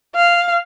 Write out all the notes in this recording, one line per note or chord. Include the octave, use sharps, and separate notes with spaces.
F5